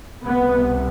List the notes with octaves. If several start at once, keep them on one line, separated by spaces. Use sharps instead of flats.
C2 C3 B3